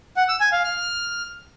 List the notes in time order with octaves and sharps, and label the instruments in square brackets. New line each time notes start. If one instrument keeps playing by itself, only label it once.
[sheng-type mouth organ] F#5
E6
G#5
F5
F6